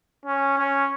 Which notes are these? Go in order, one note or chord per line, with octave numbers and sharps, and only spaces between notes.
C#4
C#4